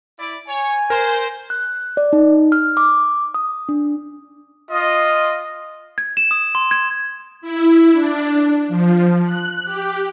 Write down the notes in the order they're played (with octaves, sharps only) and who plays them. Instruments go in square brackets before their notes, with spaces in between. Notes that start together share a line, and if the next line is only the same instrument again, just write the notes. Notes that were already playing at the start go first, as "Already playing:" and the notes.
[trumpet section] E4 D5
[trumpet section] C#5 [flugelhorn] G#5
[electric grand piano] A#4 [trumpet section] C5
[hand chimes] F#6
D5
D#4
F6
D6
D#6
D4
[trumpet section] F4 D#5
[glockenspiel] G#6
E7
D#6
C6
G#6
[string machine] E4
D4
F3
F#6
G4